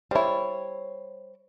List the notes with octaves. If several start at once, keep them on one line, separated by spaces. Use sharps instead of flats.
G3 E4 C5 C#5